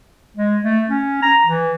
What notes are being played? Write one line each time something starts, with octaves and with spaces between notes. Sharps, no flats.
G#3
A3
C#4
A#5
E3